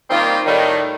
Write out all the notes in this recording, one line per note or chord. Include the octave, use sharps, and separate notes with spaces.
D#3 G3 A#3 C4 F4
A2 D#3 G3